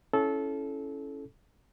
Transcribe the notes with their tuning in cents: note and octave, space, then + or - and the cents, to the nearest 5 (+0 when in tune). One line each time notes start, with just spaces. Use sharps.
C#4 +0 E4 +0 A4 -20